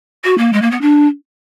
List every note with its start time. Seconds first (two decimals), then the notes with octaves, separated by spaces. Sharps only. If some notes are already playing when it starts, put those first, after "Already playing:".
0.24 F#4
0.37 A#3
0.52 G#3
0.61 A#3
0.71 B3
0.81 D4